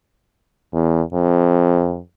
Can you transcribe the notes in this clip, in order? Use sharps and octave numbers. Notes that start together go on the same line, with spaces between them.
E2
F2